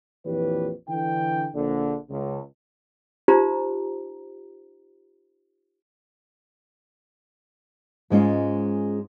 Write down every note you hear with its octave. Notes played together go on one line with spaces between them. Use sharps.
A#1 F2 E3 G4 B4 C#5
D3 E3 G5
A#1 D3
C#2
D#4 F4 G4 C5 A#5
G#2 G#3 C#4 F4